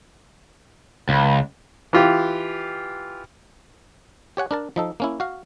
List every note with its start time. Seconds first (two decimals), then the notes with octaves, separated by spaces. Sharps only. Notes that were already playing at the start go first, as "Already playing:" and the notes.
1.09 C#2
1.93 E3 F4 G4
4.37 G4 C#5 F#5 G#5
4.51 D4 A#4 A5
4.76 F3 D#4 A4
5.00 A#3 C#4 E4
5.20 F#4 F5